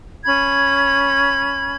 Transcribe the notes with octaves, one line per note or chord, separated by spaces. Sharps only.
C#4 B5 G#6